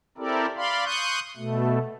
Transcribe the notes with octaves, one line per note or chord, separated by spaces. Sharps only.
C4 E4 G4 A4 A#4 D5
D5 F5 B5 C6
C6 C#6 D#6 F#6 G6
B2 A3